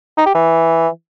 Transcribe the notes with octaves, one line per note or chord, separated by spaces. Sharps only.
D#4
G4
E3